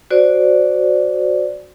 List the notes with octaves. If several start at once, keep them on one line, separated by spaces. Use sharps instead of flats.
F#4 C5 D5